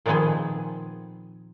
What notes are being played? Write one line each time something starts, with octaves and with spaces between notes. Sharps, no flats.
A#2 D#3 F3 B3 C4 G#4